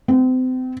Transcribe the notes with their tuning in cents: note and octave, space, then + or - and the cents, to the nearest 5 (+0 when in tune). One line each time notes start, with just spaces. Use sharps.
C4 -35